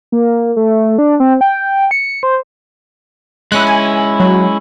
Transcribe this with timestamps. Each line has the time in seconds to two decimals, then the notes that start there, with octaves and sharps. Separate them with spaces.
0.12 A#3
0.56 A3
0.98 D4
1.20 C4
1.41 G5
1.91 C#7
2.23 C5
3.52 G#3 C#4 E4 F#6
3.67 G#5
4.20 F#3